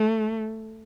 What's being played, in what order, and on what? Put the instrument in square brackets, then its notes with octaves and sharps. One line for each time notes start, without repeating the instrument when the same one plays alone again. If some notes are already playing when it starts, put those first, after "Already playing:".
Already playing: [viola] A3